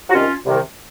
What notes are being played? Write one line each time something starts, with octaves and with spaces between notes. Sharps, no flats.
F#4
C2 C3 D#3 C#4 F4
C2 C3 D#3